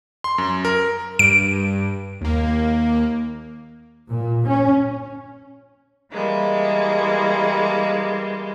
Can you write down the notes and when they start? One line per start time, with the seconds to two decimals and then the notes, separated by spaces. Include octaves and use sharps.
0.24 C6
0.38 F#2
0.65 A#4
1.19 G2 D7
2.21 D#2 A#3
4.10 A#2
4.48 C#4
6.12 E3 G3 G#3 A#3